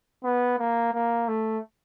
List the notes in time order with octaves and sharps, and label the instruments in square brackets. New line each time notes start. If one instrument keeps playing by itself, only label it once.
[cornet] B3
A#3
A#3
A3